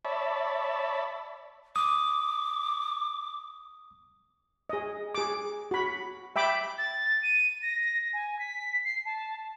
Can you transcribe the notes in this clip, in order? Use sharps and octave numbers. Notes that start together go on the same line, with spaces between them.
C#5 D5 E5 A5 B5
D6 D#6
G#4 D#5
G#4 D6
F#4 B5
E5 G5 B5 D6
A6
D#7
A#6
G#5
B6
C7
A5